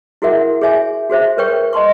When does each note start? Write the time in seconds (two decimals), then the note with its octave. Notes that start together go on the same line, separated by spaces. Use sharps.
0.22 E4 F#4 G#4 A#4 E5 F#5
0.61 G#4 C#5 E5 G#5
1.10 F#4 G#4 C5 E5
1.38 A#4 B4 C#5 G5 C#6
1.73 D#5 A5 C6 C#6